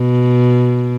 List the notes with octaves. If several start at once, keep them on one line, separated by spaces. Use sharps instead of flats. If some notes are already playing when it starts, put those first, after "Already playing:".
Already playing: B2